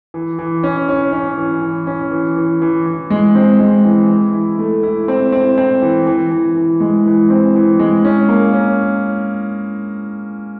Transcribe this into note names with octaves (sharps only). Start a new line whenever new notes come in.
E3
E3
C#4
C#4
C#4
E3
E3
C#4
E3
E3
E3
E3
G#3
C4
G#3
E3
E3
E4
A3
E4
C4
C4
C4
E3
E3
E3
E3
G#3
E3
C4
E3
G#3
C#4
A#3
C#4